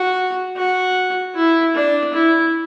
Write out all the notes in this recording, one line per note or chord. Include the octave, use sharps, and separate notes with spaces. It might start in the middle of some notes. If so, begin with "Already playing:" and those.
Already playing: F#4
F#4
E4
D4
E4